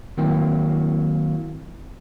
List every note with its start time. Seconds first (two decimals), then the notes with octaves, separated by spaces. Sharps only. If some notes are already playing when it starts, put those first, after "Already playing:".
0.17 D#3 F#3 A#3 C4 E4